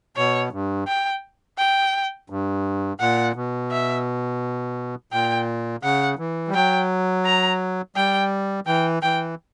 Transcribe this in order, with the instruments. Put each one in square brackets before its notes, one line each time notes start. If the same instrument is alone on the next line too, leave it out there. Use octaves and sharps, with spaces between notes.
[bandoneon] B2 [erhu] C#5
[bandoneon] G2
[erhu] G5
G5
[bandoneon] G2
[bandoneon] A#2 [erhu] F#5
[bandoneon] B2
[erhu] E5
[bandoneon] A#2 [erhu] G5
[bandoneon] C#3 [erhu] F#5
[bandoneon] E3
G3
[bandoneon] F#3 [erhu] G5
[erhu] A#5
[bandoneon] G3 [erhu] G5
[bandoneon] E3 [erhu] G5
[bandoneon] E3 [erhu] G5